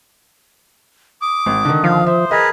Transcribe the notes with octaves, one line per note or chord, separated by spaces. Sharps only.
D6 D#6
G#1
D3 D#3
F3 F5
C5 E5
G#4 A#4 B4 D#5